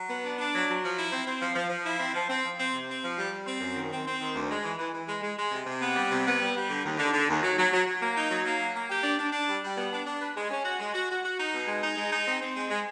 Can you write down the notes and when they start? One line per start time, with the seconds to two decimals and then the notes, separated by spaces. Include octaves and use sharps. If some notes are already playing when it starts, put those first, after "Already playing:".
Already playing: F#3
0.10 B3
0.24 D4
0.38 D4
0.54 F#3
0.68 F#3
0.83 F3
0.97 E4
1.12 C4
1.26 C4
1.41 F3
1.55 F3
1.70 F3
1.85 E4
2.00 C4
2.14 F3
2.29 C4
2.44 F3
2.58 C4
2.74 C3
2.88 C4
3.03 F3
3.17 G3
3.31 G3
3.46 C4
3.61 F#2
3.76 D#3
3.91 C4
4.06 C4
4.20 D#3
4.35 D2
4.49 G#3
4.63 E3
4.79 E3
4.93 E3
5.07 G#3
5.22 G#3
5.37 G#3
5.52 C3
5.67 C3
5.81 B3
5.96 G3
6.10 C3
6.25 B3
6.40 G3
6.55 G3
6.70 D3
6.84 D#2
6.98 D3
7.13 D3
7.28 D#2
7.43 F#3
7.58 F#3
7.72 F#3
7.86 F#3
8.02 A#3
8.15 D#4
8.30 F#3
8.46 A#3
8.59 F#3
8.75 A#3
8.90 G4
9.03 D4
9.19 D4
9.33 D4
9.47 G3
9.63 G3
9.76 B3
9.92 D4
10.06 D4
10.20 B4
10.36 G#3
10.50 C#4
10.64 F#4
10.80 G#3
10.94 F#4
11.09 F#4
11.24 F#4
11.38 D#4
11.53 B2
11.67 G#3
11.82 D#4
11.96 G#3
12.11 D#4
12.27 C4
12.41 C4
12.55 G#3
12.70 G#3